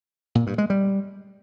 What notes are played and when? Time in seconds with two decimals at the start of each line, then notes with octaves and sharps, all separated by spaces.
0.35 A#2
0.47 G2
0.58 G#3
0.70 G3